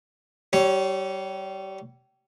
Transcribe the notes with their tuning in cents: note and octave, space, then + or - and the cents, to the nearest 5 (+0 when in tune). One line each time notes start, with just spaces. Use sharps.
G3 -30 C#5 +0